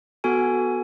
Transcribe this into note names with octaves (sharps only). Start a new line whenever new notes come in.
B3 F#4 A4 G#5